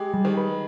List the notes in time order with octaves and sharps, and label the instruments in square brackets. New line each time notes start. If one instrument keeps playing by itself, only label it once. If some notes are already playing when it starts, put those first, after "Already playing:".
Already playing: [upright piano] G#3 [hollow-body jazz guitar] G4
[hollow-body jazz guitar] G3
[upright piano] D#3
[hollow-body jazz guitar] B4